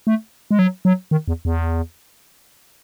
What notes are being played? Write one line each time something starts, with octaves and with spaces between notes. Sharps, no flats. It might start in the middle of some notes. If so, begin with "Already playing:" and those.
A3
G#3
F#3
F#3
D#3
E2
E2